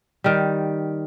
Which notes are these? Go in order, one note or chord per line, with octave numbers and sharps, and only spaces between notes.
D#3 G3